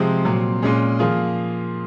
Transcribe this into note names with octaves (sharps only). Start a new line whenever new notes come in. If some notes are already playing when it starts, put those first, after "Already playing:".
Already playing: C3 F3 G#3 C4
A#2 F#3 C4
A#2 G#3 C#4 G#4
F3 A#3 F4 G#4